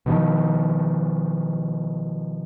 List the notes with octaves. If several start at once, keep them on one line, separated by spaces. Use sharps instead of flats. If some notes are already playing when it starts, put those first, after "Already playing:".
B2 D#3 F3